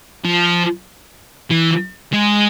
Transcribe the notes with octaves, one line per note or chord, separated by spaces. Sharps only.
F3
E3
G#3